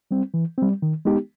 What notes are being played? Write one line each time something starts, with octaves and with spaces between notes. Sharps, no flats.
G3 C4
E3
G3 C4
D#3
G#3 B3 D#4 G4